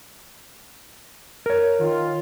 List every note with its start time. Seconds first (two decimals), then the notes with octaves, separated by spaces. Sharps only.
1.46 A#4 C#5
1.80 D#3 F4